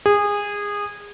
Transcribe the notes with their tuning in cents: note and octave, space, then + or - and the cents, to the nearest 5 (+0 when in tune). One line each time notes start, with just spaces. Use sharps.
G#4 -20